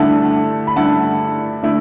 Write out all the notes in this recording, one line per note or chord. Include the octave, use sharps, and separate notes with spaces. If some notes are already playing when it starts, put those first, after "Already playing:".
Already playing: G2 D3 A3 E4 F#5 A5
B5
G2 D3 A3 E4 F#5 A5
D3 A3 E4